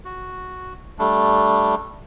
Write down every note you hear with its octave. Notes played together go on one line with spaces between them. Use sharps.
F#4
G3 A3 D4